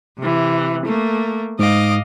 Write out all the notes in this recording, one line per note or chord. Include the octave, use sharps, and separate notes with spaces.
C3 E3
A3 A#3
G#2 D#5 F5 D6